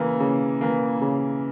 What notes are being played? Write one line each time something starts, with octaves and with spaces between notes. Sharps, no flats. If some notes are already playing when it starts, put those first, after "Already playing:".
Already playing: C#3 E3 A#3
C#3
E3 A#3
C#3